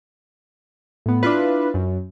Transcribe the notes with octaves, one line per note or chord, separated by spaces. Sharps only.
A2 B3
D4 E4 F4 B4
F#2